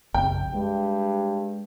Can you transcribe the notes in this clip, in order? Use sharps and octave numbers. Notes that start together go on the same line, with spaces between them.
A#1 F#2 C#3 G5
G2 G#3